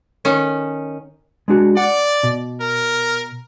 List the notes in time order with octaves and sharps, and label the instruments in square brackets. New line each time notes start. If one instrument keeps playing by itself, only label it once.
[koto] D#3 C#4
[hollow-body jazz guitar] G#3 D4 F#4
[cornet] D5 [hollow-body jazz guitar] F#5
[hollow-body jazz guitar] B2
[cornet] A#4